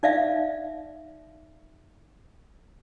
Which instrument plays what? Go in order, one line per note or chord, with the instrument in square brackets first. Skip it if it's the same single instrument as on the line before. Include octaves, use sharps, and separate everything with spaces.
[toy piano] D#4 D5 E5 F5